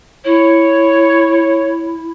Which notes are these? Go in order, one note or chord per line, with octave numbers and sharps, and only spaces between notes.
E4 C#5